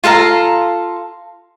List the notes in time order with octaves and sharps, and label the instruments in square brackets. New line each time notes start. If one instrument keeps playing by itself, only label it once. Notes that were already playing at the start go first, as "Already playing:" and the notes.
[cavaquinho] F4 A4 F5 A#5